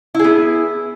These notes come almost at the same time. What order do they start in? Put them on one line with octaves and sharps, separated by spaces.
E4 G#4 B3